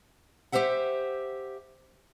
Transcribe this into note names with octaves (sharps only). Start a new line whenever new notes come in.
G4 A#4 C5 E5 F#5